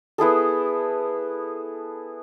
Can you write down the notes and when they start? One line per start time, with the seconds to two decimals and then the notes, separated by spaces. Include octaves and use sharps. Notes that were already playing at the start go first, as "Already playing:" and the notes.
0.18 B3 E4 G#4 A4